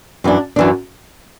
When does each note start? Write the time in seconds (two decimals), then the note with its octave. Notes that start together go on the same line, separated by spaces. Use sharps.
0.24 F#2 E3 D4
0.56 F#2 E3 D4